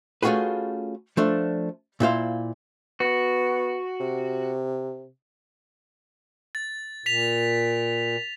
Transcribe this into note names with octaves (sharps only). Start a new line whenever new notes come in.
A3 C#4 F4 F#4 G#4 B4
F3 A3 D4
A#2 E4 C5 F5
B3 F#4
C3
A6
A#2 B6 F7